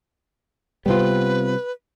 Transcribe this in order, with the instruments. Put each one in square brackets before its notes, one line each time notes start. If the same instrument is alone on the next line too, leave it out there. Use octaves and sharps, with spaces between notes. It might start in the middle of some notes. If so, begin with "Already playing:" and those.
[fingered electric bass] C3 G3 [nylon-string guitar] B3 C4 F4 [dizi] B4